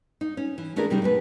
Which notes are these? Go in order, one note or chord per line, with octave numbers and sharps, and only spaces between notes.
D#4
C#4
E3
A3 C#4 D4 E4 G#4 A#4
C3 G3 C#4 D#4
D2 B2 A3 B4